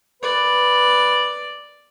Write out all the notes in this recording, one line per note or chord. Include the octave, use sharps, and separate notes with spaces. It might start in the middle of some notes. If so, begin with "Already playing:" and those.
B4 D5